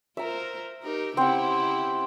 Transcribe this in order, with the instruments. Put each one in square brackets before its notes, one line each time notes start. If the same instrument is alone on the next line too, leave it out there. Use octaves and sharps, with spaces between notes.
[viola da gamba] F4 A#4 C5 [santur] E5 A#5
[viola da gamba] D#4 G4 A#4
[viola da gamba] C#3 E4 G4 [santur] C4 F#5